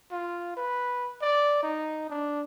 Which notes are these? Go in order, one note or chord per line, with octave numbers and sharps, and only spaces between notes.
F4
B4
D5
D#4
D4